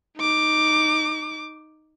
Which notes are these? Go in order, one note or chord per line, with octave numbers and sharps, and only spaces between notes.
D#4 D6